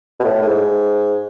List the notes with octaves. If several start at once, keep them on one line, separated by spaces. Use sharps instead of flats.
B2
A2
A2
G#2